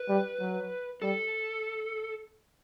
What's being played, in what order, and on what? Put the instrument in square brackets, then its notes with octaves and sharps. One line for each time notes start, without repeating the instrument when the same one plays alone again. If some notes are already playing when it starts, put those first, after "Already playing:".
Already playing: [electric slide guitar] B4
[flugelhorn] G3
F#3
[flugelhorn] G3 [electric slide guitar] A4